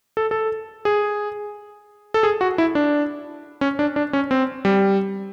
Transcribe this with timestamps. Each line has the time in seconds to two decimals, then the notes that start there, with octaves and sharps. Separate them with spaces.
0.17 A4
0.31 A4
0.85 G#4
2.14 A4
2.23 G#4
2.41 F#4
2.58 E4
2.75 D4
3.61 C#4
3.79 D4
3.96 D4
4.13 C#4
4.31 C4
4.65 G3